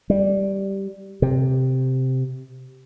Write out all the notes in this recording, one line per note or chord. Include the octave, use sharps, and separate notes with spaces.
G3
C3